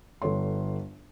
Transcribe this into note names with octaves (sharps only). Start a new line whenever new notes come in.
G1 A4 C#5 C6